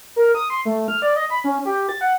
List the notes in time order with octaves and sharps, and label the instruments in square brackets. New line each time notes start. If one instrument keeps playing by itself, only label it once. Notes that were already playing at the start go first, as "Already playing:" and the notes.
[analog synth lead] A#4
D#6
C6
A3
F6
D5
D#5
B5
C#4
G4
A6
F#5